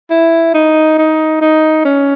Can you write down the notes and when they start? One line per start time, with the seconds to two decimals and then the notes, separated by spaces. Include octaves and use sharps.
0.10 E4
0.54 D#4
0.98 D#4
1.41 D#4
1.85 C#4